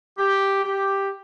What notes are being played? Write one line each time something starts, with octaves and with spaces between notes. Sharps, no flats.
G4
G4